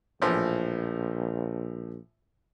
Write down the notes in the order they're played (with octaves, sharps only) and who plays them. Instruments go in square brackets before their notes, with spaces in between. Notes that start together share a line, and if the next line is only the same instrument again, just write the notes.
[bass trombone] A#1 [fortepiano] A2 E3 F3